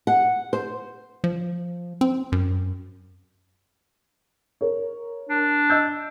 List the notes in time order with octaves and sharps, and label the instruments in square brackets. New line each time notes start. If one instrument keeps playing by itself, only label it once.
[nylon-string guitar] F#5
C5
[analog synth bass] F3
C4
F#2
[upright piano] A#4 C#5
[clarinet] D4
[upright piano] D#5 E6 G6